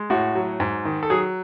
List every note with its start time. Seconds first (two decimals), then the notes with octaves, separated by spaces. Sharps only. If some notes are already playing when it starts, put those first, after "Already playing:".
Already playing: G#3
0.10 A2 F#4
0.35 F#3
0.60 G#2
0.85 D#3
1.03 A4
1.10 F#3 G#4